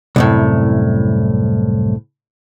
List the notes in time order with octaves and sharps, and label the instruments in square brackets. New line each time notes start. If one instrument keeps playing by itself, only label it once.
[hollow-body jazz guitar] C2 F#2 A2